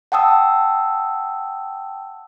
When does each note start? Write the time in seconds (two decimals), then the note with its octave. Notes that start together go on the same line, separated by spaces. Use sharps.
0.12 F#5 G5 A5 D#6 E6